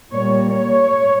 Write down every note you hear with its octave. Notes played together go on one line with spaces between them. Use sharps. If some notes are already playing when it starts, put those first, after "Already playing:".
A#2 G3 A#3 C#5
C#5